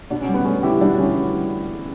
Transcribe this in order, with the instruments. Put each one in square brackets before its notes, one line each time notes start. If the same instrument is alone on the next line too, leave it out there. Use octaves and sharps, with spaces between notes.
[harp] B2 [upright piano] D4
[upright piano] C#4
[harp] G3
[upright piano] B3
[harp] B2 [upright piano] A3 C#4
[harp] D3 [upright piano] E4 G4
[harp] G3 [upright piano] D4 F#4
[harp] D3 [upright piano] C#4 E4